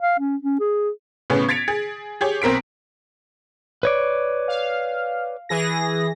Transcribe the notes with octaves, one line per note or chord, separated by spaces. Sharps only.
F5
C#4
C#4
G#4
A2 C#3 B3 C#4
G#6 A6 B6 C#7 D7 F7
G#4
G4 G#4 C#5
B1 C4 A#4 B6 D7
B4 C#5 D5
F5
E3 G#4 A#6